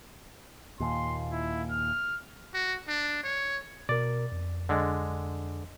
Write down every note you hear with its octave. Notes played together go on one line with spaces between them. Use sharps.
D#2 A#2 C6
E4
F6
F#4
D4
C#5
B2 A#4 D5
F2
D3 G#3